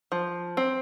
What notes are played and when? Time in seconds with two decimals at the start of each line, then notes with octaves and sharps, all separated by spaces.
0.12 F3
0.57 C4